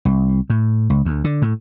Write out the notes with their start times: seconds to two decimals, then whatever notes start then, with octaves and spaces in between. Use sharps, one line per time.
0.05 C2
0.50 A2
0.90 C#2
1.05 D2
1.24 D3
1.42 A2